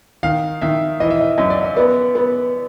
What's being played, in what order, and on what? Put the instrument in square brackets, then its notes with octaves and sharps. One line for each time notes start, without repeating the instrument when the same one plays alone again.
[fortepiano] D#3 [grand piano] F5
[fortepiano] D#3 [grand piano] E5
[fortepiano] E3 [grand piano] D#5
[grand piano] E5
D#5
[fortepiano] F#2 [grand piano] D#5
[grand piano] D5
D#5
[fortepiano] B3 [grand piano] D5
[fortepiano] B3